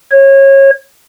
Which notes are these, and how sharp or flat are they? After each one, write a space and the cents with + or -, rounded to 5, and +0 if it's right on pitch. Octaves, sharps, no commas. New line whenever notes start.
C#5 -25